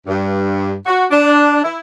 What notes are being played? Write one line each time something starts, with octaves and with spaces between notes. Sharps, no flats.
G2
F#4
D4
E4